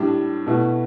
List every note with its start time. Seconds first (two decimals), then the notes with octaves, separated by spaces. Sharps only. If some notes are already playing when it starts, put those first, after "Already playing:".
Already playing: A2 G3 D4
0.46 B2 A3 E4